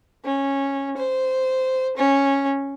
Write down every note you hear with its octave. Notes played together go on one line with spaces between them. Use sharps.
C#4
C5
C#4